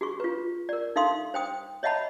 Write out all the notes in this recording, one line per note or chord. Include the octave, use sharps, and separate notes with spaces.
F#4 G#4 C#6
F4 B4
A#4 D5
D#4 A4 E5 F5 C6 D#6
C5 G5 D#6
C#5 D#5 E5 F#5 A5 B5